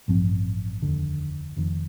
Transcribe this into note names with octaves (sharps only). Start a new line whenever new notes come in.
A1 G2 F3 C4
F1 D#2 D3
F1 F2 D#3